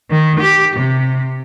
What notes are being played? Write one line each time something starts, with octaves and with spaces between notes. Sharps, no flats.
D#3
G4
C3